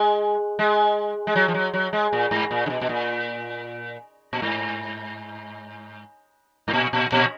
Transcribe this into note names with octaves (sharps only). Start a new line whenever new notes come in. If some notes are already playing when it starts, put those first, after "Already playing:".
Already playing: G#3
G#3
G#3
F#3
F3
F#3
F#3
G#3
A#2
G#2
A#2
D3
B2
B2
A#2
A#2
G#2
G#2
A#2
A#2
A#2